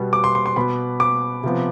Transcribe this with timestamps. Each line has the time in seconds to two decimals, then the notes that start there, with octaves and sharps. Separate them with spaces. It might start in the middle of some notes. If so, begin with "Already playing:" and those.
Already playing: B2 G3 B3
0.13 D6
0.24 C6
0.35 C6
0.46 C6
0.56 B2 B3 B5
1.00 D6
1.44 C3 F3 B3